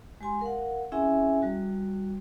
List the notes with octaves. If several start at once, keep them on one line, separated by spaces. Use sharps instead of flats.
G#3 G4 G#5 C6
A#4 F5 F#5
C4 C#4 E4 G#4 E5 G#5
G3 F#4